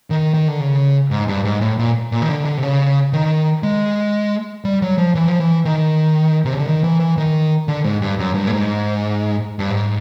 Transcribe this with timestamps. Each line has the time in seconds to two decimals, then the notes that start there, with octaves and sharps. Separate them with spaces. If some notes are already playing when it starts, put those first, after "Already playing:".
0.10 D#3
0.34 D#3
0.48 D3
0.60 C#3
1.11 G#2
1.28 G2
1.45 G#2
1.61 A2
1.78 A#2
2.12 A#2
2.22 D#3
2.30 D3
2.45 D3
2.57 C3
2.63 C#3
3.13 D#3
3.63 G#3
4.65 G3
4.82 F#3
4.98 F3
5.15 E3
5.28 F3
5.40 E3
5.65 D#3
6.45 C3
6.53 C#3
6.59 D3
6.67 D#3
6.84 E3
7.00 E3
7.17 D#3
7.68 D3
7.84 G#2
8.02 G2
8.19 F#2
8.35 G2
8.47 A2
8.52 G#2
9.59 G2
9.70 G#2